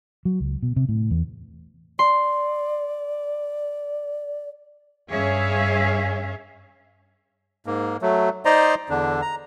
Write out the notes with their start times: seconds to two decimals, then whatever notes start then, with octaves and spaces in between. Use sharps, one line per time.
0.25 F#3
0.40 C#2
0.63 B2
0.76 C3
0.89 A2
1.11 E2
1.99 D5 C6
5.10 G2 C#4 G#4 C#5 E5 F5
7.66 G#2 A#3
8.02 F#3 A3
8.45 D#4 C5 D5 D#5 A#5 C6
8.89 E2 D3 D4
9.22 A#5